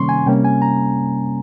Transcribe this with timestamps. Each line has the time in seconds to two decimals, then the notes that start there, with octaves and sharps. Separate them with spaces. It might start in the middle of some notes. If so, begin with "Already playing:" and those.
Already playing: C3 D#3 G3 A#3 C#4 C6 C#6
0.09 G#5
0.26 C3 G3 A#3 C#4 G5
0.44 G#5
0.62 A#5